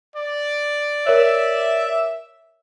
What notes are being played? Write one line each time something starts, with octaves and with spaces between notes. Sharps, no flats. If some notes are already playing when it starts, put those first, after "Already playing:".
D5
A#4 C#5 E5